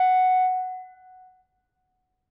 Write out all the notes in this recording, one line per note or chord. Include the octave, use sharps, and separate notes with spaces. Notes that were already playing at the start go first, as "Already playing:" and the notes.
Already playing: F#5